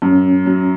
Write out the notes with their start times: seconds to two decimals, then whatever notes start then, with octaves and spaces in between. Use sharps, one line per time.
0.02 F#2 C#4
0.46 F#3